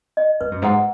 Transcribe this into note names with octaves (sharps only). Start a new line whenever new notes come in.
D#5
G#2 B4
F#2
G#2 F#5